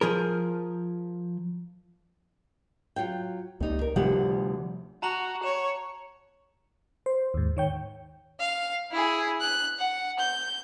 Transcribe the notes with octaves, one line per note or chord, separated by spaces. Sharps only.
F3 G#4 A#4
F#3 F4 G5
C#2 G3 A#3 D#4
A#4
D2 C3 F3 G3 G4 F#5
F#4 A5 A#5 F#7
C#5 E7
C5
D#2 G#2
D#3 C#5 G5
F5
E4 G#4
F#6
F#5
G6